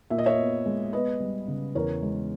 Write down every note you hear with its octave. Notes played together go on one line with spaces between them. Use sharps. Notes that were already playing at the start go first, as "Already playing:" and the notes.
A#2 E5
D#5
C#5 E5
B3
G#3
B3 B4 D#5
G3
C#3
E2 A#4 C#5
G#3